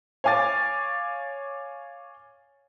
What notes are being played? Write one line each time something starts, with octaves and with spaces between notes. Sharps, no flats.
C#5 F5 G#5 D6 A6